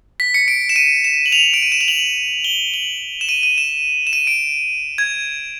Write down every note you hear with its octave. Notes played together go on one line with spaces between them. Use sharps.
B6
C#7
D7
E7
D#7
E7
F#7
F7
D7
D#7
E7
F7
F#7
G7
F#7
E7
D#7
D#7
E7
E7
D#7
D7
G#6